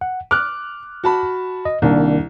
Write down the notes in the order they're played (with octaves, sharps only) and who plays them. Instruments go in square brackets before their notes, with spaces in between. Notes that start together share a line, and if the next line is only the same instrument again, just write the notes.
[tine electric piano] F#5
[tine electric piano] D6 [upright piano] F6 F#6
[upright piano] F#4 A5 B5
[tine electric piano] D#5
[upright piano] C2 [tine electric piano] D#3 A#3 D4